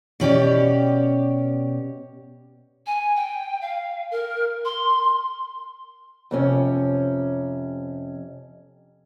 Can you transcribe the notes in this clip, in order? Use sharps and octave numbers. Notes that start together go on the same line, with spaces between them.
B2 C#4 G4 D5
G#5
G5
F5
A#4
C6
F2 C3 C#4